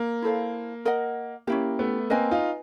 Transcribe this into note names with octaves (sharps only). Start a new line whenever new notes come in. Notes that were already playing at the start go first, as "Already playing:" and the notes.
Already playing: A#3
E4 A4 C5 F5
A#4 D#5 F#5
A#3 C#4 E4 G4
A3 B3
A#3 C4 B4 D#5 G#5
D#4 F4